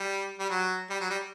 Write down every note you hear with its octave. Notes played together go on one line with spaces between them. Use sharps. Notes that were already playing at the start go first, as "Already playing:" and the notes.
Already playing: G3
G3
F#3
G3
F#3
G3